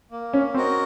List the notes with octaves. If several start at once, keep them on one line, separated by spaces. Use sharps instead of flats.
A#3
C#4
C4 C#4 F#4 A#4 D#5